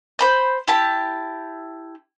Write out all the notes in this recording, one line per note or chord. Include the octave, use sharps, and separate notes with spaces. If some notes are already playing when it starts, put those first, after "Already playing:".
C5 B5 G6
E4 G4 A5